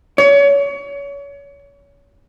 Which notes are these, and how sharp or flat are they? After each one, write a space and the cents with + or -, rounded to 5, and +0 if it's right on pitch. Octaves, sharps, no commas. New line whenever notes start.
C#5 +30